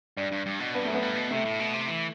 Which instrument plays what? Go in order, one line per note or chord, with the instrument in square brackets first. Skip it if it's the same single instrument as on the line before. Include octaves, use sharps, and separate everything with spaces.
[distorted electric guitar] G2 [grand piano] D4
[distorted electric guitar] G2
G2
B2
[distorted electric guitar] G2 [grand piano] B3
[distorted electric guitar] F#2 [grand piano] A3
[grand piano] B3
[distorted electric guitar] G2
B2
[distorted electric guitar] C3 [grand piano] A3
[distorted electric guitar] A2
B2
C3
E3